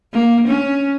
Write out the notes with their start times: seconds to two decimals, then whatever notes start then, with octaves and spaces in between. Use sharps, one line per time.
0.13 A#3
0.48 C#4